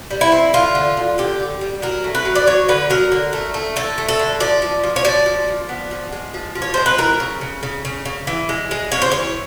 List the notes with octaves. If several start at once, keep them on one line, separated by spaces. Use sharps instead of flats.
G3
E4
C4
D3 F4
D3
D3
D3 G4
D3
G3
F#3 A#4
A3
B4
F#3
D5
F#3 C#5
D3 B4
F#3 A#4
D3
A3
A3
D3 A4
A3
A4
D3
F3 D5
F3
F3
C#5
F3 D5
F3
F3
B3
F3
G#3
F3
F3
C#5
G#3 C5
B4
E3 A#4
C#3
C#3
C#3
C#3
C#3
E3
G#3
G#3
C#3 C#5
C5
E3 C#5